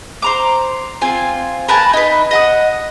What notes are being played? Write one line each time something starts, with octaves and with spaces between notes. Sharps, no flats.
C5 A#5 D6
C4 F4 G#5
A#4 B4 G#5 A5
D#4 B4
D#5 F#5 D#6